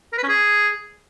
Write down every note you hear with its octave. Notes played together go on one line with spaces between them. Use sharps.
A#4
B4
C#4
G#4